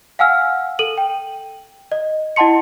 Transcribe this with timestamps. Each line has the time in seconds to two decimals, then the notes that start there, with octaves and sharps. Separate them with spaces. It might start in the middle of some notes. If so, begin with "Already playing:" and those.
0.19 F5 F#5 G#5 E6 F6
0.79 A4 D#7 F#7
0.98 G5
1.92 D#5
2.36 E4 D#5 F#5 A5 C6 C#7